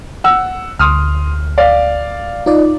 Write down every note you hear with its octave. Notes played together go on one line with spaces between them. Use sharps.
F#5 E6
D2 C6 D#6 F6
D5 F5
D#4 F4 D5